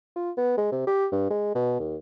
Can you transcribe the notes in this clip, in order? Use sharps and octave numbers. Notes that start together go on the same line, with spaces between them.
F4
B3
G#3
C3
G4
G2
G#3
B2
D#2